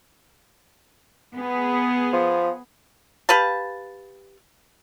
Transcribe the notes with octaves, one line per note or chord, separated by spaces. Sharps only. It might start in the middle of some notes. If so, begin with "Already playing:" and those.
B3 G#4
F3
G4 B4 F5 A5